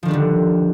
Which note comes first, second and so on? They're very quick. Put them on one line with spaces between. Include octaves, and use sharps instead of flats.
F3 D#3 D4 G3 D3